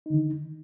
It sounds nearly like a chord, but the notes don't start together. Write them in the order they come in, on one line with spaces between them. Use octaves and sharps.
D#4 D3 D#3